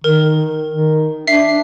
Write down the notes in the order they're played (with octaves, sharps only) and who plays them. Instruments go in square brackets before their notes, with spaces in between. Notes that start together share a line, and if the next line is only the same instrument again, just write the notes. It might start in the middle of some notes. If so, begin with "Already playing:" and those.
[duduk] D#3 [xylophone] A#4
[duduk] D#3
[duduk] D4 [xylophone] E5 C7